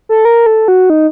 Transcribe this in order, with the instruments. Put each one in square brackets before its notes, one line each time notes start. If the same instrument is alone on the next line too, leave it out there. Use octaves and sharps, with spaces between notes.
[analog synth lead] A4
A#4
A4
F#4
D#4